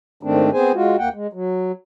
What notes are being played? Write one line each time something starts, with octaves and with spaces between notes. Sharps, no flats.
G#2 D#3 A3 C4 D4
B3 C4 G#4 C5 G#5
G#3 F4 F#4
D#2 A#3 F#5 G5
G#3
F#3